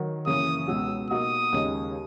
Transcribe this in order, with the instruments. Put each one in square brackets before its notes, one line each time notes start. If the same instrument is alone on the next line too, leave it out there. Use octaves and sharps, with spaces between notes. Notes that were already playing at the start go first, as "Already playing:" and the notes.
Already playing: [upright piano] D#3 F#3
[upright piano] F#2 C#3 E3 A#3 [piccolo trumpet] D#6
[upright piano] C#2 B2 F#3 B3 [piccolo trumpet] E6
[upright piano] B2 A#3 D#4 F#4 [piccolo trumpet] D#6
[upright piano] D#2 C#3 G#3 D#4